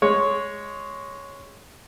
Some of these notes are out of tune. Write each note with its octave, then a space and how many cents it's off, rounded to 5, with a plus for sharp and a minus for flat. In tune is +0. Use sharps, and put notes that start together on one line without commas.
G#3 +0 C#5 +0